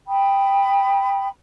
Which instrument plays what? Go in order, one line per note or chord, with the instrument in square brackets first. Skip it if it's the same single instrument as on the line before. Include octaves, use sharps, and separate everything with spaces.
[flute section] G5 B5 D#6